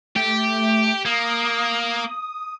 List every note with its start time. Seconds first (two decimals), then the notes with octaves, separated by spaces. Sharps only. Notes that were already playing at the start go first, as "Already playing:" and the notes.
0.16 A3 G4
1.06 A#3 D#6